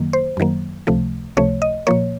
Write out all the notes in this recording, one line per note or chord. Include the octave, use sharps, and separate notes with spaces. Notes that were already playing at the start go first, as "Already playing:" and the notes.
Already playing: F#2 D#3 F#3 A#3
C5
F#2 D#3 F#3 A#3
C#2 C3 F3 A3
C#2 C3 F3 A3 C#5
D#5
A#2 F3 A#3 C#5